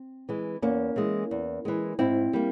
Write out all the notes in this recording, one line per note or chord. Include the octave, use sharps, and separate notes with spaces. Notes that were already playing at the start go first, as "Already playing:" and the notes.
Already playing: C4
E3 G#3
E2 A#3 C#4
E3 G#3
E2
E3 G#3
G#2 C4 E4
G3 A#3